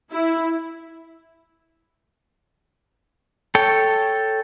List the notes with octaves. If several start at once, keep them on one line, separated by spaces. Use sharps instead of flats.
E4
A4 C#5 G5